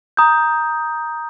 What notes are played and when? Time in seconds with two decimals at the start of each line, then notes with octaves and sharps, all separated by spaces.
0.17 A#5 D#6 G6